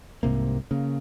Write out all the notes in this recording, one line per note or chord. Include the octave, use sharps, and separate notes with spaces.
C2 G#2 C3 A#3
C#3 A#3